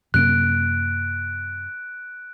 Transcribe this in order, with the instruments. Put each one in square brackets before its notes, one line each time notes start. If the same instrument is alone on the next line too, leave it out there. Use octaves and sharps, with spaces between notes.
[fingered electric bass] F#2 C3 A#3 [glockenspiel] F#6 D7